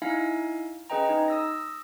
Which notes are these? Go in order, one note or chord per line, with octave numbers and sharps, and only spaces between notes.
D#4 E4 E5 F5 G#5
C#4 G#4 B4 D#5 G5 A#5
D#4
D#6 E6 A#6